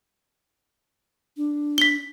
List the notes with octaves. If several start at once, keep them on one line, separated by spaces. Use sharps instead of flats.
D4
B6 G7